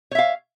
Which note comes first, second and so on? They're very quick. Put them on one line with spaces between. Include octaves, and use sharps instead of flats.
C#5 E5 F5